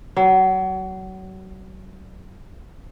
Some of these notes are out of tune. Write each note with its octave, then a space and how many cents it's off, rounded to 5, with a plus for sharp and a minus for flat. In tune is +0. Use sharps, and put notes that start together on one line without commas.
F#3 +30